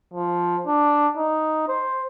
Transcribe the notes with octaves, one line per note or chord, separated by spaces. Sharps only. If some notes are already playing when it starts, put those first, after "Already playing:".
F3
D4
D#4
C5